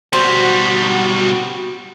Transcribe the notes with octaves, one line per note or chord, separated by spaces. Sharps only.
B2 G3 F#4 C5